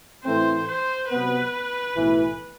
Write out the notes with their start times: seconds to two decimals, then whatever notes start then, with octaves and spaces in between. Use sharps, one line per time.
0.25 A2 E3 A3 C4 C5
0.67 C5
1.09 C3 F#3 B3 B4
1.93 B1 A2 E3